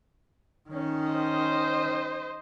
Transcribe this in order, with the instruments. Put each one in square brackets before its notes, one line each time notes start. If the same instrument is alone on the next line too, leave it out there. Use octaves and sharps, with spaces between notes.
[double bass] D#3 C#4
[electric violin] C5 D#5